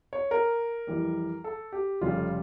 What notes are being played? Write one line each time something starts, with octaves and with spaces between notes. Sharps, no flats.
C#5
A#4
F2 E3 G3
A4
G4
F1 F2 C#3 G3 F4